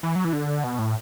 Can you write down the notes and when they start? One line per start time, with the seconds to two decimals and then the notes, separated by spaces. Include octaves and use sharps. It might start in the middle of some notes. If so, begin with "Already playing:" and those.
0.03 E3
0.16 F#3
0.25 E3
0.33 D3
0.64 B2
0.79 A2